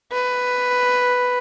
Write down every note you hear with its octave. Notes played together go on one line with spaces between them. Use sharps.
B4